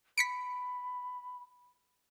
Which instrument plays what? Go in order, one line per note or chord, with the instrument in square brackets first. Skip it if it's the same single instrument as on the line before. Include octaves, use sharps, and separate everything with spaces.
[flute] B5 [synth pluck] B6 C#7 D7